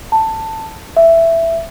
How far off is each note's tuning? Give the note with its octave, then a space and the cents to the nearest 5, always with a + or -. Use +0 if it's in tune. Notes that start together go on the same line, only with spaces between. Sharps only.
A5 +15
E5 +10